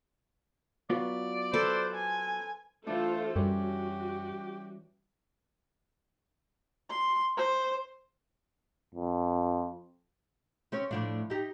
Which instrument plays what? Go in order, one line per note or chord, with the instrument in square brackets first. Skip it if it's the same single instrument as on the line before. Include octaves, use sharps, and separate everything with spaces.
[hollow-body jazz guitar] F#3 B3 F4 [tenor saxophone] D5
[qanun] A4 B4 A5 [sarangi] C5
[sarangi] G#5
[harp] E3 D4 [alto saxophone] A3 [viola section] F4 A4 C5
[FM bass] F#2 [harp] G3 C#4 [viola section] F#4 [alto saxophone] G4
[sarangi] C6
C5
[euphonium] F2
[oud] C4 C#4 C#5
A2 F3 D4
D#4 G4